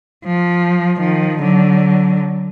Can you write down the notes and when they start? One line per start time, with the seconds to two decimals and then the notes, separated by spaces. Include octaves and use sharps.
0.25 F3
0.98 D#3 F3
1.40 D3 F#3